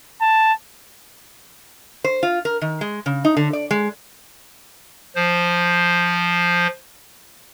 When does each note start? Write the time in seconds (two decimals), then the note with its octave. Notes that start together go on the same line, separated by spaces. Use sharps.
0.21 A5
2.04 C5
2.23 F4
2.45 A#4
2.61 D#3
2.81 G#3
3.06 C#3
3.25 D#4
3.37 D3
3.53 D5
3.71 G#3
5.15 F3 C5